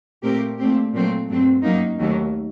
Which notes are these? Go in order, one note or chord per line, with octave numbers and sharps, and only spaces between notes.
A#2 A3 C4 G4 A#4
A#2 A3 C4 G4
A#2 F#3 A3 C4
G2 F#3 A3 C4
F#2 F#3 A#3 D#4
D#2 D#3 F#3 A3